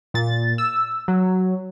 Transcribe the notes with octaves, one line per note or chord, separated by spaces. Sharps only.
A#2 A6
E6
F#3